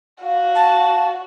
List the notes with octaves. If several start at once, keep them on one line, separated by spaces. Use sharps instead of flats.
F#4 F5
A5